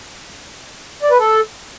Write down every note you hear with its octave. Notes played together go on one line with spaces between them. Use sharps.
D5
B4
A4